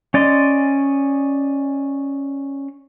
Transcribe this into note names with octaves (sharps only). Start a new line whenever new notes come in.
C#4 D5 D#5 C6